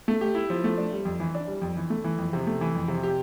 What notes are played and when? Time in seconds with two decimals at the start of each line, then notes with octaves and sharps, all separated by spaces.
0.08 A3
0.21 G4
0.35 E4
0.50 F3
0.64 A3
0.77 D4
0.92 G3
1.05 F2
1.20 E3
1.35 D4
1.47 G3
1.62 F2
1.77 E3
1.90 A3
2.04 E3
2.18 F2
2.33 C3
2.47 A3
2.61 E3
2.75 F2
2.88 C3
3.03 G4